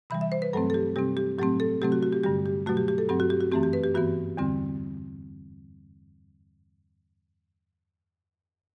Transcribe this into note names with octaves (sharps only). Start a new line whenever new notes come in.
C3 E3 G3 B5
E5
C5
B4
G2 F#3 A3 C4 A4
A4
G4
C3 G3 C4 G4
G4
A2 F#3 A3 C4 G4
A4
C3 F#3 A3 C4 G4
F#4
F#4
G4
G2 D3 G3 G4
G4
B2 F#3 A3 F#4
G4
G4
A4
G2 F#3 C4 G4
F#4
G4
F#4
F#2 E3 A3 C4 G4
G4
B4
G4
G2 E3 B3 F#4
E2 D3 G3 C4